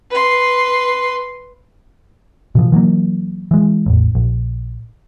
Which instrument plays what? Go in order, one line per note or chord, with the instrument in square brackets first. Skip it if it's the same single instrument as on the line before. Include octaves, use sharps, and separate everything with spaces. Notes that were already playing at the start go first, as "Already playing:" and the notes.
[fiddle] B4 C6
[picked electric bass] B2 E3 F3
E3 F#3 A3 A#3
E3 G#3
A1 E2
A#1